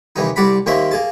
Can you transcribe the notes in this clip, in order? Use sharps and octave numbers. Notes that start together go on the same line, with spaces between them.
D#2 C3 E3 G3 D#4
C2 G3 D5 F#5 A#5 B5
D#2 D#3 A#3 C4 C#4 E5
A#3 G#4 A5